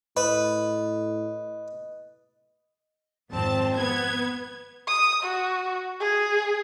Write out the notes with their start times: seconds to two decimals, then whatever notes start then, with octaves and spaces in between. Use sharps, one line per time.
0.17 A2 B4 D#5
3.31 G#1 F2 C4 A5
3.76 B3 G#6
4.88 D#6
5.23 F#4
6.00 G#4